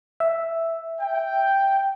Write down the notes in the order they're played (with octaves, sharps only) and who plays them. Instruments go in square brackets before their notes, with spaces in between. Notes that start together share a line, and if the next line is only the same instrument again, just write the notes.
[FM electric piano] E5
[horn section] G5